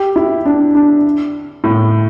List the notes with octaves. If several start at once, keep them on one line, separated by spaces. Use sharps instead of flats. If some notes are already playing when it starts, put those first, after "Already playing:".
Already playing: G4
E4
D4
D4
A2